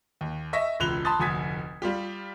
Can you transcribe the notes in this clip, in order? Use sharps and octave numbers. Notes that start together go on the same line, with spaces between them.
D#2
D#5 E5 C#6 E6 A#6
E1 C#2 B5 F#6 F7 G7
A5 B5 C6 D#6 A6
F1 D2 G#5 D#6 G#6 B6
G3 F4 G4